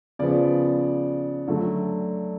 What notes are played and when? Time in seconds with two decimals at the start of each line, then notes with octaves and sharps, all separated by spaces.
0.19 C#3 F3 B3 D5
1.47 D3 F#3 A3